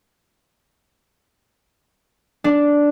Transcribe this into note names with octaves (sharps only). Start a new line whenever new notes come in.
D4